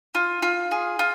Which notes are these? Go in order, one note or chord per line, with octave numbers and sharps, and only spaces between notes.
F4
F4
G#4
F4